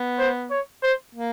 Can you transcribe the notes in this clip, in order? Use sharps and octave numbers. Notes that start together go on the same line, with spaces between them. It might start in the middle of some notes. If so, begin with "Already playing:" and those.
Already playing: B3
C5
C#5
C5
A#3